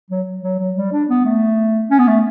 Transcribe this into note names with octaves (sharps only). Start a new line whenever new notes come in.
F#3
F#3
F#3
G3
D4
B3
A3
C#4
B3
A3